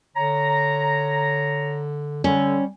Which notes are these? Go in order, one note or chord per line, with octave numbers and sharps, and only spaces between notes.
D3 C#5 A#5
D3 G3 C#4